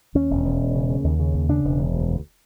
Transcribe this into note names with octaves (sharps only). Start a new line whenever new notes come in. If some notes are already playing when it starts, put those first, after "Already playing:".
D#2 C#4
E1
E1
E1
C#3
C#3
D#2
C#3
D#2
C#3 D4
E1
E1
D2
D2